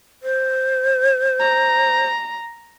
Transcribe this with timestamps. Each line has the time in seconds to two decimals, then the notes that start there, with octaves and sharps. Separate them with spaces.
0.23 C5
1.40 A#5